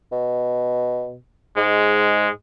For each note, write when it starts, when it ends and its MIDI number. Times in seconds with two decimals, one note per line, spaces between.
0.12 1.18 47
1.57 2.30 44
1.57 2.30 56